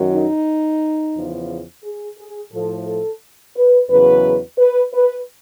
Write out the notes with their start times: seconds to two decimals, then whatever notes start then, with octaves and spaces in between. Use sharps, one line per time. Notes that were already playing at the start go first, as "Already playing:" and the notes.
Already playing: F#2 D#3 F#3
0.12 D#4
1.15 E2 C#3 F3
1.84 G#4
2.18 G#4
2.52 A2 F3 A4
2.86 A4
3.55 B4
3.90 E2 C#3 F#3 B4
4.58 B4
4.93 B4